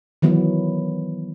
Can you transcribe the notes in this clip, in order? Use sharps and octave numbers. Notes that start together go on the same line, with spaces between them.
D#3 E3 F#3 B3